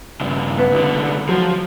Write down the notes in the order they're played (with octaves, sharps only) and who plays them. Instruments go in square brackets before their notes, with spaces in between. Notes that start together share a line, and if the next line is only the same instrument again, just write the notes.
[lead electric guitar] G2 C#3
[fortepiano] B3
[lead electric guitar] C2 D3
[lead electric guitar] F3 [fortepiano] F#3